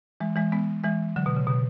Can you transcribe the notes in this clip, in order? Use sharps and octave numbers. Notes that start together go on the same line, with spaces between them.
E3 G#3
E3 G#3
G#3 B3
E3 G#3
D3 F#3
B2
C#3
B2